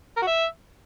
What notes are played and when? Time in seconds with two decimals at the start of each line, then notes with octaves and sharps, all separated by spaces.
0.17 A#4
0.22 F#4
0.27 E5